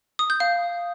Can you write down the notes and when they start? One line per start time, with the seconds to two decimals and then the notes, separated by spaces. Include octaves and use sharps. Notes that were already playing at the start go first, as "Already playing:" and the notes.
0.19 D#6
0.30 G6
0.40 F5